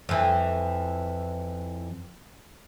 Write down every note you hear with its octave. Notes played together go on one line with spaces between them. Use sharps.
F2 E3